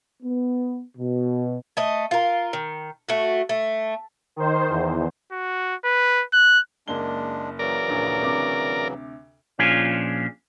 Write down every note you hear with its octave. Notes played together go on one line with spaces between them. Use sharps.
B3
B2
A3 D#5
F4 A#4
D#3
A3 F#4
A3
D#3 C5
E2
F#4
B4
F#6
F#1 G#3 A#3 D4 G7
C#3 E3 F#3 A#4 D5
D#1 A#1
D2 C3 D6
A#2 F3 C#4 D4 F4 G#4